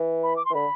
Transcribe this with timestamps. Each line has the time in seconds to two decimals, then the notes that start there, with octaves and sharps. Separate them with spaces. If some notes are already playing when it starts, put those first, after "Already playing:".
Already playing: E3
0.23 B5
0.36 D6
0.45 C6
0.50 E3
0.54 D3 B5